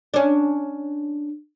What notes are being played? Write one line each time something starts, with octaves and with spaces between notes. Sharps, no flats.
C#4 D4